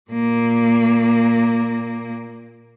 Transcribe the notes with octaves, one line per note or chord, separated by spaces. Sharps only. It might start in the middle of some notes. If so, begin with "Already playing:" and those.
A#2 A#3